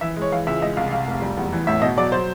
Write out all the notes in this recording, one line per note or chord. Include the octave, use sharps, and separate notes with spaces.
E3 E5
G#3
C#5
E3 F5
C#2 E5
G#3 D#5
C2 F5
C3 F5
F1
G3
E2
E3
A1 E5
B2 D#5
F#3 D5
F#3 C5